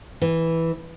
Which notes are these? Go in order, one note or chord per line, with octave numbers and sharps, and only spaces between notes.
E3